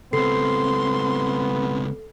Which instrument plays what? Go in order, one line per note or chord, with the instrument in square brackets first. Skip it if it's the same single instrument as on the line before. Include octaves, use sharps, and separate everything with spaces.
[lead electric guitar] C#2 C4 [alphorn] B3 [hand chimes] A4 C7 [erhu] C6